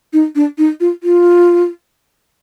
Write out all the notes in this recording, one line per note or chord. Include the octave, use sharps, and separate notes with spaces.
D#4
D4
D#4
F4
F4